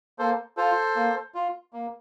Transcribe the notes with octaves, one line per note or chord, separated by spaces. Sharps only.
A#3 A4 C5
F4 A4 C5
A#3
F4
A#3